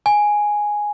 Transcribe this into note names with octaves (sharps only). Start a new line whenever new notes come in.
G#5